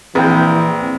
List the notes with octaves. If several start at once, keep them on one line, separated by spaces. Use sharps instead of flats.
A#1 E3 C4 G#4 B4 G5